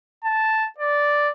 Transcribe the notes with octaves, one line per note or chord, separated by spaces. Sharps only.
A5
D5